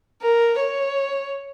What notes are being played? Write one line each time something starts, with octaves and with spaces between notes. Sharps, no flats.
A#4
C#5